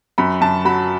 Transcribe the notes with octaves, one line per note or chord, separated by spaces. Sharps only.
F#2 B5
F#2 A5
F#3 B5